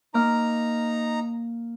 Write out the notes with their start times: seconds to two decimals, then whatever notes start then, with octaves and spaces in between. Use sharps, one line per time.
0.14 A#3 D#4 A#5 F6